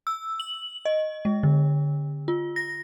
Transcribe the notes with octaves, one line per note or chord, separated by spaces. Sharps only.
E6
F#7
D#5
G#3
D3
F4
A#6